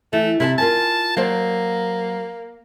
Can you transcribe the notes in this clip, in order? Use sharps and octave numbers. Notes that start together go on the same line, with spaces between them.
E3 A3
C3 E4 E5 A5
F4 A#4 G#5 A5
F#3 A#3 C5 D5